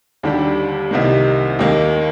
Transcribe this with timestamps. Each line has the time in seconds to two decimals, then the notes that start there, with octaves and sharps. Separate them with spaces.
0.23 D#2 D3 G3 D4 G4
0.91 C2 C3 D#3 A#3
1.59 D#2 D#3 A#3